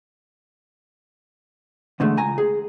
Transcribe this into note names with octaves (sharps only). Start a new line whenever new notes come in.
E2 G#2 D3 G#3 A3
C#2 G#5 A#5
G#4